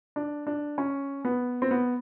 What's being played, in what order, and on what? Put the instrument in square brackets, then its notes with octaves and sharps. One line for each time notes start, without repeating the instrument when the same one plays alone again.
[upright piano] D4
D4
C#4
B3
C4
B3